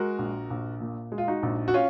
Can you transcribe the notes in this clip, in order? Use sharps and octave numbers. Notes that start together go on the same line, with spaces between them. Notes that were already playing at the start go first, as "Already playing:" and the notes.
Already playing: G#3 F#4 A#4
A#1
A#1
A#2
G#3
F4
D#4 F#4
A#1
F#4
C#4 F4